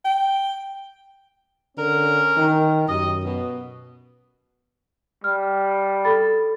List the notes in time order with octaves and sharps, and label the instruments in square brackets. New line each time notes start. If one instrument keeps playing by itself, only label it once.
[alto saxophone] G5
[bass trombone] D3 [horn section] C#4 A#4
[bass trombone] D#3
[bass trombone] F#2 [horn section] G4 D#5
[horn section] B2
[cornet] G3 [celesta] F6
[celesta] A4 B5 A6